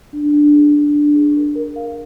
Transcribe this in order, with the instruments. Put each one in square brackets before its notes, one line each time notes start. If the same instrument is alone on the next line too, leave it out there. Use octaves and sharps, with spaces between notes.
[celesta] D4
D4
G#4
D4
D4
G#4
A#4
A#4
F5